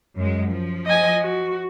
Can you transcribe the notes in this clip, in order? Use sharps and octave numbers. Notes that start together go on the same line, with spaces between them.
F#2 G#3
F3
D#5 G#5
F#4